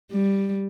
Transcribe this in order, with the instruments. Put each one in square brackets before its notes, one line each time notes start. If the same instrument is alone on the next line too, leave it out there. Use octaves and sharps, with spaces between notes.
[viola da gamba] G3